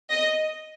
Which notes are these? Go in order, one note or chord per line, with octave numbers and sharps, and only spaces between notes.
D#5